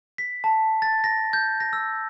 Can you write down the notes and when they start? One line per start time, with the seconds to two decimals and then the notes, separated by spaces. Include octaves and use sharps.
0.18 B6
0.44 A5
0.82 A6
1.04 A#6
1.33 G6
1.60 A#6
1.73 E6